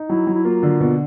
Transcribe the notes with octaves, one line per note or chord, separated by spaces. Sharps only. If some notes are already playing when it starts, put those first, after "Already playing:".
Already playing: D#4
F#3 E4
F#3
E4
A#3 F4
D3
B2 F4